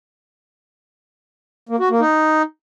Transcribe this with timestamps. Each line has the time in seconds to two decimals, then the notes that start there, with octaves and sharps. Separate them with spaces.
1.69 A#3
1.80 F#4
1.90 A#3
2.01 D#4